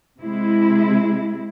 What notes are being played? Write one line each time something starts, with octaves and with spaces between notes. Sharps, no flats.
C3 G#3 E4